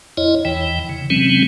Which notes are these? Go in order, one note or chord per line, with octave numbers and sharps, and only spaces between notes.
F2 E4 C#5 D#5
E2 E3 G5
C#3
C3 E3 F#3 G#3 C4 C#4